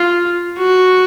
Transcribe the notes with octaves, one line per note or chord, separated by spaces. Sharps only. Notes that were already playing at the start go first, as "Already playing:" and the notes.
Already playing: F4
F#4